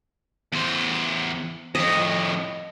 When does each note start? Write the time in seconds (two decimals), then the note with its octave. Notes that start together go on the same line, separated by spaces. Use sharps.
0.52 E2 C5
1.75 F2 A2 D#5